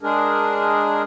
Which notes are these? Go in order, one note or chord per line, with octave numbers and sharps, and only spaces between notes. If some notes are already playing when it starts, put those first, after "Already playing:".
G#3 D4 G#4 A#4